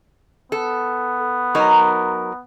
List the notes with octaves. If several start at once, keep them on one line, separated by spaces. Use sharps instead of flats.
B3 A4
F#3 D#4 A#4